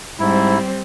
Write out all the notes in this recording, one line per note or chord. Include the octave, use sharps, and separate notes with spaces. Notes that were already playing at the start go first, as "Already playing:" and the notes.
G#2 G3 C4 E4